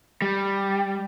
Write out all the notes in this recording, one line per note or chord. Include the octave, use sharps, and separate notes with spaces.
G3